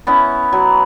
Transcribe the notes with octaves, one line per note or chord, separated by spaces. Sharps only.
B3 C#4 E4
F#3